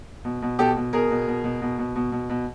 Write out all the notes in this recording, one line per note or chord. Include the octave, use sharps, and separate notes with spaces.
B2
B2
B2 G4 A4
B2
B2 G#4 A#4
B2
B2
B2
B2
B2
B2
B2
B2